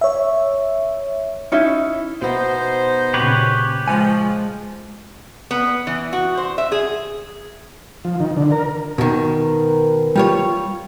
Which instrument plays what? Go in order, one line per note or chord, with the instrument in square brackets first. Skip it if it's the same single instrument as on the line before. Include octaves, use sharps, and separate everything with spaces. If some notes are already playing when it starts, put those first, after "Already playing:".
[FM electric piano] C#5 E5
[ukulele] C#4 D#4 E4
[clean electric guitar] B2 B3 [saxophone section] D#4 C5
[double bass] A#2 C#3 [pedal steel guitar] G4 B4 C#5
[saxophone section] F3 [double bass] G#3 [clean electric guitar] G#5
[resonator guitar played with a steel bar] B3
E3
F#4
C5
E5
G#4
[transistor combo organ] F3
D#3
D3
A#4
[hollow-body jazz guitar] B2 D#3 [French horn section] A#4 B4
[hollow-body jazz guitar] G3 F4 C#5